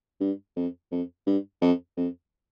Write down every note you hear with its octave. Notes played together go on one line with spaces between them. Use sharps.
G2
F2
F2
G2
F2
F2